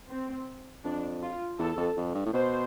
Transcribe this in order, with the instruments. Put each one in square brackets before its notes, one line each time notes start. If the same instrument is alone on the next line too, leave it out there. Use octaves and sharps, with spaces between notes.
[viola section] C4
[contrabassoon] F2 [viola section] D4
[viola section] F4
[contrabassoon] E2 [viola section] A4
[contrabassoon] F2
F2
G2
A2
[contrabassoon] B2 [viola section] C5